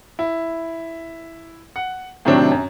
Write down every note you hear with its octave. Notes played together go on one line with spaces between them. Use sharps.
E4
F#5
A2 C3 D#3 F#3 C4 D4
F#2